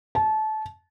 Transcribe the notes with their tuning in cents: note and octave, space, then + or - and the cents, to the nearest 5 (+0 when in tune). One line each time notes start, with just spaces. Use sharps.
A5 -25